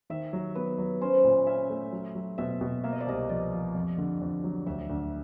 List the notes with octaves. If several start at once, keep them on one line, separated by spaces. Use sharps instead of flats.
D#3 E5
F#3
B3 B4
F#3
C#4 C5
A#2
C#4 E5
A3
F#3
F#3
B2 E5
B2
A#3 E5
D#5
D5
C2 D#5
F3 D5
F3
F2
D3
F2
F#3
D2 E5
D2